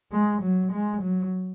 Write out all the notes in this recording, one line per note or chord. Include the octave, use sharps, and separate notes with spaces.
G#3
F#3
G#3
F#3